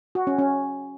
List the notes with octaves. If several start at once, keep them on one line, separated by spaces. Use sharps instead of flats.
F#4
C#4
C#4